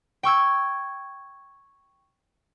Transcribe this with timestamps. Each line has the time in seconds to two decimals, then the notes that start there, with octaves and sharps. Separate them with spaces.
0.23 G5 C#6 E6 G#6